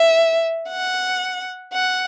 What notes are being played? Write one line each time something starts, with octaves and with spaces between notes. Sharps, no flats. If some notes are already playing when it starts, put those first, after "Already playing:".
Already playing: E5
F#5
F#5